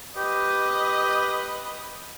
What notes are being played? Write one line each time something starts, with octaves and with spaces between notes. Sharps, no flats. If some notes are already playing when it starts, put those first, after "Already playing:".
G4 B4 D#5